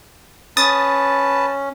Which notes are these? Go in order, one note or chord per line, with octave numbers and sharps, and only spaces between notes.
C#4 B4 A5 D#6 A6